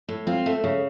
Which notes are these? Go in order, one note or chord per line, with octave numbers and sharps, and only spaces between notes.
A2
C4 F4
A3
C#3